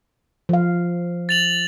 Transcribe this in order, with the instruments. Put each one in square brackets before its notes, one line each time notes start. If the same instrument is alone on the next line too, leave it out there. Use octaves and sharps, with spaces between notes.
[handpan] F3 F5
[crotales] A6 F7 F#7